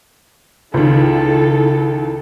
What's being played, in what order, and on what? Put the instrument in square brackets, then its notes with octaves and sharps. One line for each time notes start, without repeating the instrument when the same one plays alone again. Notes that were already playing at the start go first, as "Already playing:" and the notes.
[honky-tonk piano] C#2 D#3 [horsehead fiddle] E4 A4